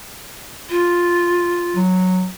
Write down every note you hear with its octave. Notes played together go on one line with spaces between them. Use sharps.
F4
F#3